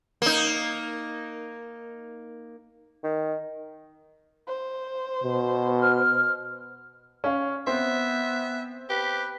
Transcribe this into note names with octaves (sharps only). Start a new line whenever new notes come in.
A#3 D#4
D#3
C5
B2
F6
C#4 F5
B3 C4 E5 C6
G4 B4